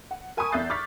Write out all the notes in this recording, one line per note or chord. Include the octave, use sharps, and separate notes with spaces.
F#5
A#4 G#5 A5 B5 C#6 D#6
E2 E5 F#6 G6 A6 C7
C#6 D6 F6 F#6 A6 B6